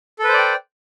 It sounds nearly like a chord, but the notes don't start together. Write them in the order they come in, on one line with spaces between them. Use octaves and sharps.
A4 B4 C5 D5 G5